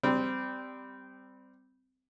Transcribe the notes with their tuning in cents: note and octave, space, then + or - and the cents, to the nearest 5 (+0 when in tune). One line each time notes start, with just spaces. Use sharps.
G3 +5 C4 -20